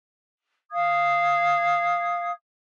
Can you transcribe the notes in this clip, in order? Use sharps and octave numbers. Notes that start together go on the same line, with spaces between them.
F5 D#6 G#6